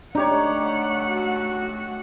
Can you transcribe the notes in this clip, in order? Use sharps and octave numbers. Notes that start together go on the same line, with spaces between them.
A3 D4 D#4 G4 C#5 F#5
F#4